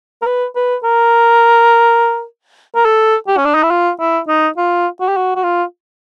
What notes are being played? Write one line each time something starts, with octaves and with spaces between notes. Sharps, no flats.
A#4
B4
B4
A#4
A#4
A4
G4
C#4
D4
D#4
E4
F4
E4
D#4
F4
F#4
G4
F#4
F#4
F4